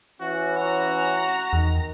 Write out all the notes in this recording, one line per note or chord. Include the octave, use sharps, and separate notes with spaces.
E3 C#4 F#4
F#4 A#5
E2 D#3